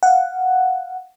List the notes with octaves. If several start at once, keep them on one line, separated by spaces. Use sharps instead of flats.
F5 F#5